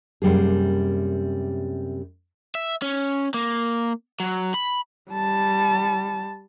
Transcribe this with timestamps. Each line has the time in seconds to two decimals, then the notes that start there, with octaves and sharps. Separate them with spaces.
0.22 F#2 C3 G3 A#3 G#4
2.55 E5
2.82 C#4
3.34 A#3
4.20 F#3
4.54 B5
5.12 G3 A5